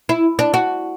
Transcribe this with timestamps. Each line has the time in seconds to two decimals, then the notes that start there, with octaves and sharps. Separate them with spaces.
0.09 E4
0.39 D4
0.54 F#4